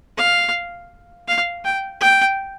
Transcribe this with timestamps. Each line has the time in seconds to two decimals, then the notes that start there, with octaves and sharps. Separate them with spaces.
0.17 F5
1.28 F5
1.64 G5
2.01 G5